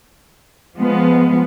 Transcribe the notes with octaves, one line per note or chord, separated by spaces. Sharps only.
F3 G#3 B3